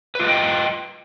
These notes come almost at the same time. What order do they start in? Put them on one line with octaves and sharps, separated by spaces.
B4 F4 D#5 G5